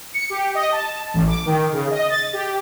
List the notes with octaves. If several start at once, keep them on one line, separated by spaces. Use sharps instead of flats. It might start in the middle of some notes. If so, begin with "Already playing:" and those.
C#7
G4
D#5
A5
A1
D6
D#3
C#3
D#5
A6
G4